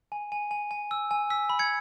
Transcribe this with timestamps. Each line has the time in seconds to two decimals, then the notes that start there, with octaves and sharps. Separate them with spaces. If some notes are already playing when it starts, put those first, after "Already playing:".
0.12 G#5
0.32 G#5
0.51 G#5
0.71 G#5
0.91 E6
1.11 G#5
1.30 E6 B6
1.50 B5
1.59 G#6 C#7